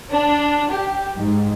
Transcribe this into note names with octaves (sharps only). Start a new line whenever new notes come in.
D4
G4
G#2